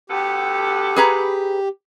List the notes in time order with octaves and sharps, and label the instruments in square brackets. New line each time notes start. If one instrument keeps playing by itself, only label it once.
[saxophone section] D2 B3 A4 [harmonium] G4
[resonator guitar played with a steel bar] G#4 B4 A#5